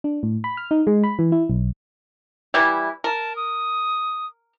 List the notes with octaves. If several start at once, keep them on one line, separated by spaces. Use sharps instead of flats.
D4
A2
B5
F6
D#4
G#3
B5
E3
E4
B1
E3 G3 E4
A#4 A5
D#6